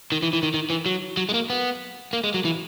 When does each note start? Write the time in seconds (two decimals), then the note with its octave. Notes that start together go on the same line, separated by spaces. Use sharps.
0.12 D#3
0.22 E3
0.33 E3
0.43 D#3
0.54 D#3
0.70 E3
0.86 F#3
1.17 F#3
1.29 G#3
1.34 A#3
1.50 B3
2.13 A#3
2.24 G#3
2.34 F#3
2.45 E3